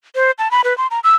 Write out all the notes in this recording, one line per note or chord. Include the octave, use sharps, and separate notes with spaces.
C5
A5
B5
B4
C6
A#5
E6